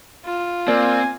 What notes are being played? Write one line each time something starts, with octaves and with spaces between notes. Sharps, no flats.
F4
A#3 C4 D5 G#5